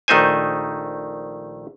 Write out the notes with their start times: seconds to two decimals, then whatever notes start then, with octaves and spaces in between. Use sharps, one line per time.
0.08 A#1 D#3 A3 D#4 C5 G#5